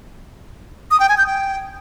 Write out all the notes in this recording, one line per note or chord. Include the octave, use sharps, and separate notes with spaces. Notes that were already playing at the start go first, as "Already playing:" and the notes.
D#6
G5
G#5
G6
G5